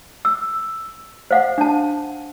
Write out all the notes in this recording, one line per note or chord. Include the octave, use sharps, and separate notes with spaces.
E6
C5 F5 F#5
D4 A5